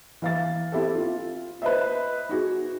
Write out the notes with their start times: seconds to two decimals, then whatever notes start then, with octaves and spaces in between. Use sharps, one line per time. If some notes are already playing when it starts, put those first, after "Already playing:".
0.22 E3 F5 A6
0.72 C4 E4 G4 A4
0.95 F4
1.62 B4 C5 D#5 E5
2.29 D#4 F#4 G#4